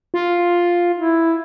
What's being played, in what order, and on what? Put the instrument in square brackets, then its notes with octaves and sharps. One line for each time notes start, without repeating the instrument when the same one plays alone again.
[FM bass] F4
[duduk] E4